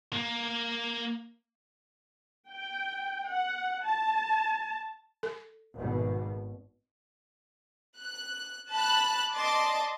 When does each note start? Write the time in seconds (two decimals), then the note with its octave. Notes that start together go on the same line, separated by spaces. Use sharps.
0.13 A#3
2.49 G5
3.28 F#5
3.85 A5
5.23 A4
5.74 G#1 B2
7.97 F#6
8.73 A5 B5 F#6
9.33 D5 D#5 A5 C6 D6